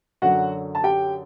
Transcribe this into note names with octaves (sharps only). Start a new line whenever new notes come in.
F#2 D3 F#3 F#4 F#5
A5
G4 G5